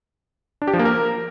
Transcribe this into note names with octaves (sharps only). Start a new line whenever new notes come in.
D4
G4
F3
A#3
A#4